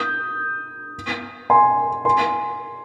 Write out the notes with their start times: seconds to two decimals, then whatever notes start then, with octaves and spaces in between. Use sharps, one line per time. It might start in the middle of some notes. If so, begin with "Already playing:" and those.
Already playing: D#6 G6
1.50 G#5 C6
2.05 G#5 C6